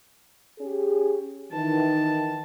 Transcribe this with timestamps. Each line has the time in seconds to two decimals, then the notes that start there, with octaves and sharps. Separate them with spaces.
0.60 C#4 G4 G#4
1.52 D#3 E3 A5